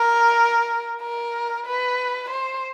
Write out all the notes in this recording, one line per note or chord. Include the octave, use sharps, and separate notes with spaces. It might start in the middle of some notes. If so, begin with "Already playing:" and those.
Already playing: A#4
A#4
B4
C5